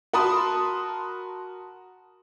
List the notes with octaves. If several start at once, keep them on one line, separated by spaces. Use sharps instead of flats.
F#4 A#4 A5 B5 C6 D#6